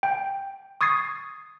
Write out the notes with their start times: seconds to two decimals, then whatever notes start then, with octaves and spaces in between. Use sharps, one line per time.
0.03 G5
0.81 C#6 D#6 G#6 A6 C7